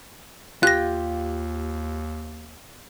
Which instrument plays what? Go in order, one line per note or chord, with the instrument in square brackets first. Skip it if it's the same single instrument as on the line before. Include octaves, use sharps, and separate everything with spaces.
[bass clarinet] D#2 [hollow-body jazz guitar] F4 G4 [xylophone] F#6 A#6